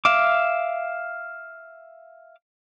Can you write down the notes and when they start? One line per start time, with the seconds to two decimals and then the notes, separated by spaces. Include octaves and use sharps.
0.05 E5 F5 D6